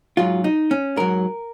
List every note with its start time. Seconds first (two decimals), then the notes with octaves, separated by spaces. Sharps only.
0.17 G#2 F#3 F4
0.44 D#4
0.71 C#4
0.97 G#2 F#3 A#4